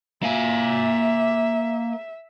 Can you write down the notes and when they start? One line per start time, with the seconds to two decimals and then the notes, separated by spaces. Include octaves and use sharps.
0.23 A#3 E5 G#5